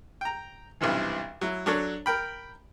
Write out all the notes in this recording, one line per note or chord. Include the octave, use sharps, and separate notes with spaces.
G5 A#5
B1 G2 C3 E3
F#3 E4
F#3 D4 A4 C#5
A#4 G5 B5